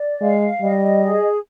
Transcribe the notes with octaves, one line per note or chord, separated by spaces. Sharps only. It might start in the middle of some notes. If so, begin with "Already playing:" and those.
Already playing: D5
G#3 F5
G3 D#5
G#4